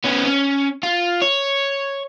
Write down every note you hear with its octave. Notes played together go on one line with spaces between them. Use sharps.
B3 C#4
C#4
F4
C#5